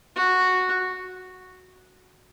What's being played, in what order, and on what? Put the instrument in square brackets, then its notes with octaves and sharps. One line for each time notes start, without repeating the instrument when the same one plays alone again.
[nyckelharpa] F#4